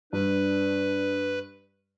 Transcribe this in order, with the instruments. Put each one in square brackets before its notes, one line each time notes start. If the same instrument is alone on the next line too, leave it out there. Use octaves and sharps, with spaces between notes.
[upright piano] G2 [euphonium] D4 [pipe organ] B4